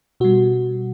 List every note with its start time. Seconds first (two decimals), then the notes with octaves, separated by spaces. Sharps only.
0.20 B2 G3 F#4